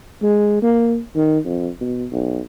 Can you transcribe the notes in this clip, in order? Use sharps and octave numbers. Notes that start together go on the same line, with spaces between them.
G#3
A#3
D#3
F2
B2
B1